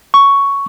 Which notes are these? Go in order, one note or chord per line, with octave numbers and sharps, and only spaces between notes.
C#6